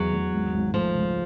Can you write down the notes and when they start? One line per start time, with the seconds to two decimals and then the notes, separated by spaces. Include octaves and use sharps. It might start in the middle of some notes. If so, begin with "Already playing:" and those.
Already playing: E2 F#3
0.13 E2
0.33 G#1
0.54 G#1
0.74 F3 A3
0.95 C#2